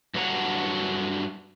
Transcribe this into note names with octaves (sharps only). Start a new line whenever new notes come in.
G2 F#3 D4 C#5 F#5 A#5